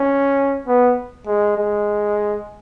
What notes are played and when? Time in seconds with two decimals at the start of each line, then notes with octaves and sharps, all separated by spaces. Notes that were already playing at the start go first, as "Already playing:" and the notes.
Already playing: C#4
0.67 B3
1.27 G#3
1.57 G#3